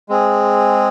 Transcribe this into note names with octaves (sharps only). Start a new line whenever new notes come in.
G#3 C4 G#4